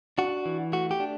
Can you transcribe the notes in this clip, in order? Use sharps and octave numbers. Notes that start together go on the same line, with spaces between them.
D4 F#4
E3
A3 F#4
G4
D4